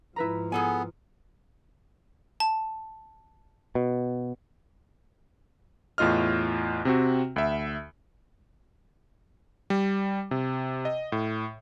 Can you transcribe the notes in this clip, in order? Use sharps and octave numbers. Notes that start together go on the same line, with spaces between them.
G#2 F3 E4 B4 A#5
B3 G#4 A4 G#5
A5
B2
E2 A2 F4 D#5 F6
C3 C4 F#4
D2 E5
G3
C3
D#5
A2